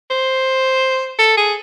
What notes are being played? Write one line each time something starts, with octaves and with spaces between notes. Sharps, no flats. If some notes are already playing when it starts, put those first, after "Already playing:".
C5
A4
G#4